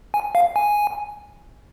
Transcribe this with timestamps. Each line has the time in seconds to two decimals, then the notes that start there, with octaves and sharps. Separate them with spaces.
0.14 G#5
0.35 F5
0.56 G#5